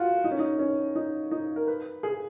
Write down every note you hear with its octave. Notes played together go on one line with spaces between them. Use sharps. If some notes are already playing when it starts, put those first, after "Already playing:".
Already playing: F4 F#4
D#4
C#4
D#4
C#4
D#4
D#4
A#4
B4
G#4